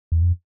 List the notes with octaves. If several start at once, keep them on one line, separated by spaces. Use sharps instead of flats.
E2
F2